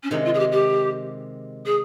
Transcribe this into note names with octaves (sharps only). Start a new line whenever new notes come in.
C#4
C3 D#3 G#3 D#4
F4
G#4
G4
G4
G#4